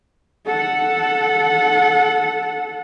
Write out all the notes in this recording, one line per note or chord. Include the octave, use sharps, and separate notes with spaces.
A4 F#5